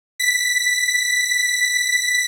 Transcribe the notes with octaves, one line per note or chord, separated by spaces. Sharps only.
B6